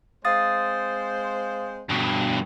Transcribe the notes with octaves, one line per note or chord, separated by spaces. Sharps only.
G#3 C4 C5 F5 D#6 A6
G2 B2